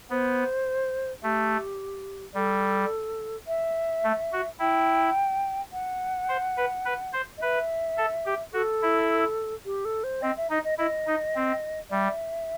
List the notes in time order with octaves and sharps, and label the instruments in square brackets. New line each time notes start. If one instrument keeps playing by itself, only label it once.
[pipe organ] B3 [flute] C5
[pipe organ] A3 [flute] G4
[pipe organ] G3 [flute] A4
[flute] E5
[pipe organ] A3
F#4
[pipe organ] E4 [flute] G5
[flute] F#5
[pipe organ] C5
B4
B4
C5
[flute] D#5
[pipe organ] B4 [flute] E5
[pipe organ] A4
G4
[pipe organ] F#4 [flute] A4
[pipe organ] E4
[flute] G4
A4
C5
[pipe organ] C4 [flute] D#5
[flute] E5
[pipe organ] D#4 [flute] D#5
[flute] D#5
[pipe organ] E4 [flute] D#5
[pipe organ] D#4
C4
[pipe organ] G3 [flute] E5